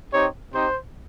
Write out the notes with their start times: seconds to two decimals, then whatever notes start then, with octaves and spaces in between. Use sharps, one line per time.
0.13 C4 D#4 G4 C#5
0.53 C4 D#4 G4 C5